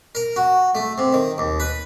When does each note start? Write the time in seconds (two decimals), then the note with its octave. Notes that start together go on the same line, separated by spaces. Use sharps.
0.15 A#4
0.36 F#4
0.75 A3
0.98 C3
1.13 D#3
1.38 D#2
1.60 B4